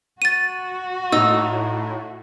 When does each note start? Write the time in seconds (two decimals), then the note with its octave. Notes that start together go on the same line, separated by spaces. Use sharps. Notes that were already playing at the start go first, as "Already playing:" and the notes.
0.22 F#4 A6 D#7
1.12 A2 D#4 E6